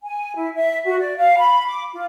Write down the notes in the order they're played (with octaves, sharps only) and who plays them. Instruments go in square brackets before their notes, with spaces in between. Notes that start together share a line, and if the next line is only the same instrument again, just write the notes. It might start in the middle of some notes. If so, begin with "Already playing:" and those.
[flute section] G#5
E4
E5
F#4
D5
F5
B5
D6
F4